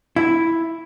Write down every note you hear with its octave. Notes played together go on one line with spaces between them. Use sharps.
E4